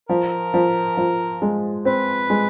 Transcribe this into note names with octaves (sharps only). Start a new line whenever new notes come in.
F3 A#4
F3
F3
G#3
C4 B4
G#3